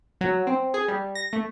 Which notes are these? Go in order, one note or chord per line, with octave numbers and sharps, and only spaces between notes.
F#3
C4
G#4
G3
A#6
A3